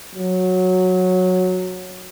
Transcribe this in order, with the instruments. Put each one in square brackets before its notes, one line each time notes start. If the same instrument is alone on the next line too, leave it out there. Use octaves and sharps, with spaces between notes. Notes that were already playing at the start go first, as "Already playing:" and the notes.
[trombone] F#3